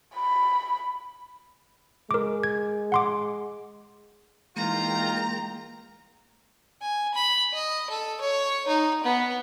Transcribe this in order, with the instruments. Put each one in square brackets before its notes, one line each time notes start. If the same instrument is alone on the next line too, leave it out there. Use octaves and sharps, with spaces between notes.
[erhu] B5
[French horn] G#3 [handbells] A#4 D6
[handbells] G#6
F#5 C6 D6
[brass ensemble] E3 D#4 F4 [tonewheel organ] G#3 A#3 G5 [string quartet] A#5
[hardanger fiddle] G#5
B5
D#5
A4
C#5
D#4
B3